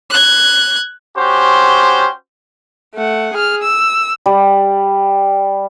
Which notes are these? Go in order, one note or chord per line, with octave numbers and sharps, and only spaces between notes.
F#6 G#6
C#4 F#4 G4 C5
A3 F#5
G#4 F6
E6
G3